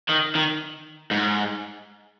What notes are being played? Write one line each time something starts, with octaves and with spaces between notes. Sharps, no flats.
D#3
D#3
G#2